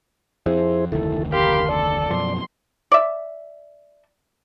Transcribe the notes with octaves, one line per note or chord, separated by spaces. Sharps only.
F2 E4 G#4 C5
F1 D2 D#3 E4 A4
G4 A#4 F5 B5 C6
A4 D5
F#2 B2 F3 C6
D5 E5